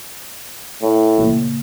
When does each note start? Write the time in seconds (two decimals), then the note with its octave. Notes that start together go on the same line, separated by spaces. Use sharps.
0.82 A2
1.18 A#2 C#3